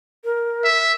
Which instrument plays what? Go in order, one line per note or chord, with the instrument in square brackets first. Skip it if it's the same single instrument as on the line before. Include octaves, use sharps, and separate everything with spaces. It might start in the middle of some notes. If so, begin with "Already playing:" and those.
[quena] A#4
[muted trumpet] E5